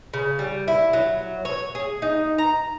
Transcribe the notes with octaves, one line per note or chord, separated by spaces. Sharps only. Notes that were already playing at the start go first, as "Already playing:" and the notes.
C#3
G3
E4
F#3
C#5
G#4
D#4
A#5